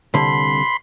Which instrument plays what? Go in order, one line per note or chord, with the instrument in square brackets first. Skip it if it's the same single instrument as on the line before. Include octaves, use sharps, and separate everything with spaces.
[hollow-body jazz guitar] C2 D3 [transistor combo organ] B5 C6